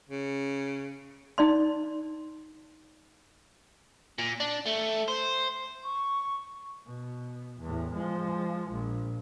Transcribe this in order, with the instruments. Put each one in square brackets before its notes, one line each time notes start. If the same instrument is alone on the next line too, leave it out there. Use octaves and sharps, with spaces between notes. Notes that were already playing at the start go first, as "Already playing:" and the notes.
[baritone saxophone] C#3
[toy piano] D#4 D5 C6
[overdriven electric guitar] A#2
D4
A3
C5
[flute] C#6
[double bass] B2
E2 A2
F3 G#3
A#1